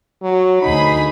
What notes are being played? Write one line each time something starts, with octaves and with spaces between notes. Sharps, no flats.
F#3
D2 D#4 G#4 B5